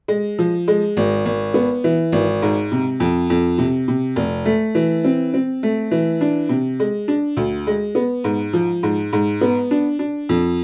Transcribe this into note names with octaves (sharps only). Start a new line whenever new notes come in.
G#3
F3
G#3
G#1
G#1
B3
E3
G#1
G#2
C3
F2
F2
C3
C3
F1
A3
E3
C4
C4
A3
E3
D4
C3
G#3
D4
D2
G#3
B3
G#2
F3
G#2
G#2
B3
D4
D4
F2